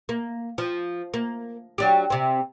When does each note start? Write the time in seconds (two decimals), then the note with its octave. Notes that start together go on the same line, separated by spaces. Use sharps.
0.09 A#3
0.58 F3
1.14 A#3
1.78 F#3 D4 G4
2.10 C3 C4